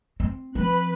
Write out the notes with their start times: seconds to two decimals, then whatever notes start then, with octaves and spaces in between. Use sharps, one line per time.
0.20 C4
0.55 F3 C4 B4 F#6